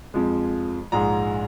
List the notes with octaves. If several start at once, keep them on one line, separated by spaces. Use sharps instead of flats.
F2 F3 G#3
A#1 G#2 G#3 A#5